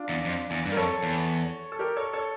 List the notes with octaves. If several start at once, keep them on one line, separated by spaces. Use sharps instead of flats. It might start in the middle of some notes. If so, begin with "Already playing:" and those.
Already playing: D4 F4
E2
F2
E2
G2
A#4
F2 A4 C#5
E2
A4
G4 A#4
A4 C#5
A4 C#5